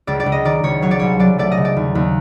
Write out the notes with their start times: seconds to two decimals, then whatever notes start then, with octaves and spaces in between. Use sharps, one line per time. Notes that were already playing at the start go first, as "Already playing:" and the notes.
0.07 C#2 D5
0.20 D5
0.26 C#2
0.32 D#5
0.45 D#3 D5
0.63 C#2 C#5
0.82 F#3 C#5
0.91 D5
0.99 C2 C#5
1.19 F#3 D5
1.38 A3 D5
1.52 D#5
1.57 C#3
1.65 D5
1.76 D#2
1.95 D#2